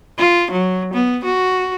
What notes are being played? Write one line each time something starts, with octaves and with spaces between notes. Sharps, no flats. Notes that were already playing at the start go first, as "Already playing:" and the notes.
F4
F#3
B3
F#4